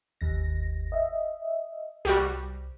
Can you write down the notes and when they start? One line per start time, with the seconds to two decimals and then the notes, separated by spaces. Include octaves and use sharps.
0.21 G1 D#2 A#6
0.92 D#5 E5
2.05 C2 G3 F#4 G4